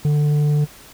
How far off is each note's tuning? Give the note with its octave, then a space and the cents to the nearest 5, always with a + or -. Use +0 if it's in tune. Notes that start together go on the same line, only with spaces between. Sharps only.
D3 +15